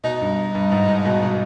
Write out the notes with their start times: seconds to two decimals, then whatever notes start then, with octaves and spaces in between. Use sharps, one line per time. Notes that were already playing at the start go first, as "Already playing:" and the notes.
0.04 B2 D#4
0.21 G2
0.55 G2
0.72 G#2
0.89 G#2
1.05 B2
1.23 B2